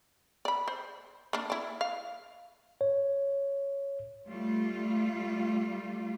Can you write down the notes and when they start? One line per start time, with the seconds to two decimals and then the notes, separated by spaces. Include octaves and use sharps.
0.45 D5 B5
0.68 C5
1.33 A#3 D4
1.50 E4 D5
1.81 F5
2.81 C#5
4.28 G3 A3 F4